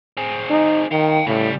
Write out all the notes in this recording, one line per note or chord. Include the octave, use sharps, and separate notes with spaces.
C4 G#4
D#4
D#3 F5 G5
A2 C#3 G3